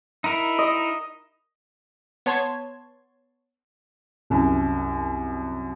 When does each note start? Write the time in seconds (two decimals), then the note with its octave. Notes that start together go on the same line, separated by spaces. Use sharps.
0.24 D#4 E4 A#4
0.58 D#5
2.26 B3 C#5 A5 C6 G#6
4.30 C2 F#2